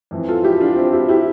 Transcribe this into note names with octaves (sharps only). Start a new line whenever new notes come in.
F2 E3
F4 A4
E4 G4
D4 F4
C4 E4
E4 G4
E4 G4